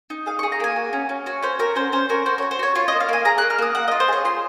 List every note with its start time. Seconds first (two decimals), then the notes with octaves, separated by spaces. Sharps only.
0.10 D#4
0.26 G#4 F5
0.39 C#6
0.43 G#4
0.52 A#5
0.60 A#3 G#5
0.76 F#4
0.93 C#4
1.09 C#4
1.26 F#4 C#5
1.43 C#4 C5
1.59 F#4 A#4
1.75 C#4 C5
1.92 C#4 C5
2.09 F#4 A#4
2.26 F#4 C5
2.38 C#5
2.42 F#4
2.51 C5
2.59 F#4 C#5
2.75 F4 C#5
2.88 D#5
2.92 A#3
3.00 F5
3.09 A#3 G#5
3.25 G#4 A#5
3.38 A#3 F#6
3.50 F6
3.58 A#3 D#6
3.75 A#3 F#5
3.88 D#5
3.91 F4
4.00 C5
4.08 G#4 C#5
4.25 F4 C6